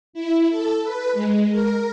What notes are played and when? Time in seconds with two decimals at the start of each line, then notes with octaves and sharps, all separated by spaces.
0.13 E4
0.49 A4
0.83 B4
1.13 G#3
1.50 A#4